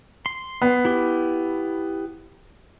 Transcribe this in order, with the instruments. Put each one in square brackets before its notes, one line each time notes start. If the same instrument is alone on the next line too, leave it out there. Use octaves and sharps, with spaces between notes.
[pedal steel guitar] C6
[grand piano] B3
[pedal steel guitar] E4 G4